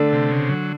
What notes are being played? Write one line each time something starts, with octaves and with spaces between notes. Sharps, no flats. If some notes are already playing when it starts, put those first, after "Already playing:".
Already playing: D3 A3 D4
C3
C#3
F#3